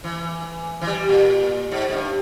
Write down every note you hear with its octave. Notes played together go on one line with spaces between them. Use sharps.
E3
E3
G3
A#2
G#2
G#2
G2